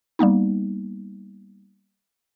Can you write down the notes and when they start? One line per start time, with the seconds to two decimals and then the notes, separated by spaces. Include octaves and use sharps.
0.19 G3 A#3 B3 D#4